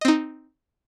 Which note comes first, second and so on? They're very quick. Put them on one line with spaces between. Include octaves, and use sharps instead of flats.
D#5 C4 D#4